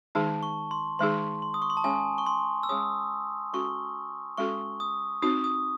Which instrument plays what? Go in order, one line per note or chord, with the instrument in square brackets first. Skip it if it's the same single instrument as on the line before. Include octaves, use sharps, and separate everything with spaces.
[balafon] D#3 G#3 D#4 G#4 [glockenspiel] A5
[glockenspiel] C#6
C6
[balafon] D#3 G#3 D#4 G#4 [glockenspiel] C6
[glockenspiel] C6
D#6
C#6
C6
A5
[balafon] G#3 C#4 G#4 C#5 [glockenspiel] G#5
[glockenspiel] C#6
C6
E6
[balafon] G#3 C#4 G#4 C#5 [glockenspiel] D#6
[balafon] G#3 C#4 F#4 A4 [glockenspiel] C#6
[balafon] G#3 C#4 F#4 A4 [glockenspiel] C#6
[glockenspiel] D#6
[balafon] C4 D#4 F#4 [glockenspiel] D#6
[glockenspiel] D#6